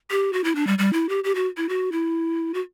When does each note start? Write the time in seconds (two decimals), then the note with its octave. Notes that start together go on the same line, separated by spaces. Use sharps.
0.11 G4
0.33 F#4
0.44 E4
0.55 D4
0.67 G3
0.79 G3
0.93 E4
1.09 G4
1.24 G4
1.35 F#4
1.57 E4
1.69 F#4
1.92 E4
2.54 F#4